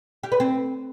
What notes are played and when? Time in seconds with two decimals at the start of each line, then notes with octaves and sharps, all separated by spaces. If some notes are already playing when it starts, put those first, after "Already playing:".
0.23 G4
0.32 B4
0.40 C4